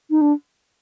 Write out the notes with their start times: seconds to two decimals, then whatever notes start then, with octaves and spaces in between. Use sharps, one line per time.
0.10 D#4
0.21 D4